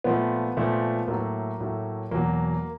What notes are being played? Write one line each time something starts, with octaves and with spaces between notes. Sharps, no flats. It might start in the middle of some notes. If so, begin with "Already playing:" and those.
A#2 F3 A3 B3
A#2 F3 A3
A2 F#3 A3 A#3
A2 F#3 A3
E2 B2 F#3 A#3